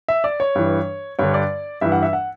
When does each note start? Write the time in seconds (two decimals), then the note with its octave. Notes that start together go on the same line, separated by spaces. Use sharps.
0.08 E5
0.24 D5
0.40 C#5
0.55 G2 E3
1.19 G2 D3 C#5
1.34 D5
1.81 G2 E3 E5
1.92 F#5
2.03 E5
2.13 F#5